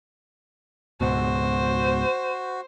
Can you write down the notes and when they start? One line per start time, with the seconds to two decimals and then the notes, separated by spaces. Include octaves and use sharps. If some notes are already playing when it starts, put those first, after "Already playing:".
1.01 C#2 G#2 B2 F#4 C5